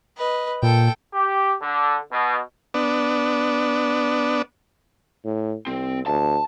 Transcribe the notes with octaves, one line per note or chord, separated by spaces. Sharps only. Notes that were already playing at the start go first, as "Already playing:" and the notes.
B4 D#5
A#2 A4 G5
G4
D3
B2
B3 D4
A2
C2 C4
D2 A5